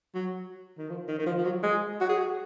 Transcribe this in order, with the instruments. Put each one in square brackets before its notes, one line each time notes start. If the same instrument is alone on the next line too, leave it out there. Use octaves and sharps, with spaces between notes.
[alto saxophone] F#3
D#3
F3
D#3
D#3
F3
F3
F#3
G#3
F#4
G#4
F#4